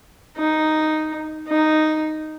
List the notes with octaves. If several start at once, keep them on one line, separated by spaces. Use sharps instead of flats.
D#4
D#4